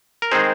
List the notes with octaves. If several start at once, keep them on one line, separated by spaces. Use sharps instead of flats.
A#4
D#3 G#3 C4 D#4 G#4 C5